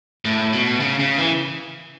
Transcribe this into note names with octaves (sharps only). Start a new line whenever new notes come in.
A2
B2
C#3
C#3
E3